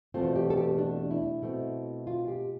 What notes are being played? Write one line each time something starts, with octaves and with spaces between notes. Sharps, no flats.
E2 B2 A3 C4 F4
G4
A4
G4
D4
E4
B2 A3 C4
F4
G4